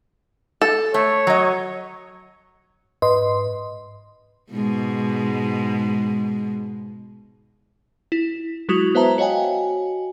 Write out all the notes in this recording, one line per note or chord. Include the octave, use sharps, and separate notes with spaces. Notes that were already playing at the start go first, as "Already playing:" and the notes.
A4
A3 C#5
F#3 D#5
G#2 B4 D#5 C6
G#2 B2 G#3
E4
F#3 G#3 E4 F#4 D#6 F7
B3 B4 C5 E5 A5 A#5
F#4 C#5 D#5 F5 G5 G#5